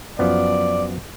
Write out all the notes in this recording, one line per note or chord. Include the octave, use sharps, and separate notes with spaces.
F#2 F3 B3 D5